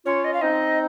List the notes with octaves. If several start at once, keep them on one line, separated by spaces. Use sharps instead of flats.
C#4 F4 C#5
D#5
F5
C4 D#4 D#5